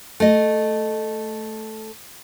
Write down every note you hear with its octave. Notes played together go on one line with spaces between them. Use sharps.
A3 D#5